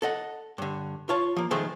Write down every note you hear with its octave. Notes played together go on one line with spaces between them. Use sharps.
A4 D#5 F#5
G2 D3
F4 C#5 A5
F3 A#3
D#3 F3 G#3 A3 G#4 C5